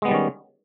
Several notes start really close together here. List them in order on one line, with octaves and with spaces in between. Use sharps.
G#3 B3 G3 D#3 C#4